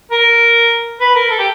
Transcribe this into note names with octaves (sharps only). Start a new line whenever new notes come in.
A#4
B4
A#4
A4
G4